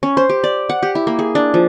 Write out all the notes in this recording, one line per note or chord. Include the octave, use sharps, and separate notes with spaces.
C#4
C5
G4
D5
F#5
G4
E4
A#3
G#4
D4
F3